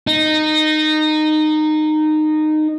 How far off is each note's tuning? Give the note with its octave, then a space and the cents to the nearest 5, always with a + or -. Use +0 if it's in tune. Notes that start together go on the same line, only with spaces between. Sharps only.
D#4 -15